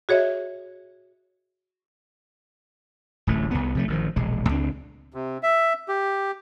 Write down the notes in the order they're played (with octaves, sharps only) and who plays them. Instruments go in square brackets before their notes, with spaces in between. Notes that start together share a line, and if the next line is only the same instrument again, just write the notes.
[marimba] F#4 G#4 C#5 D#5 E5
[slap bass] D1 A1 A3
C2 B3
C3 F3 A3
A1 D#3 F3
E1 A#1 G#3
C#2 C4 D4
[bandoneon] C3
E5
G4